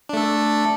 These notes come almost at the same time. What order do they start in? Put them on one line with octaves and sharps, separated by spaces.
D4 A3 A4